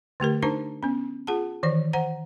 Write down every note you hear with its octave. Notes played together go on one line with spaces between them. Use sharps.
D3 A3 G4 A#4
D4 D#4 A#4 C5 A5 A#5
B3 C#4
F4 G#4 F#5 A5
D#3 E3 C5 D5
C5 F#5 A#5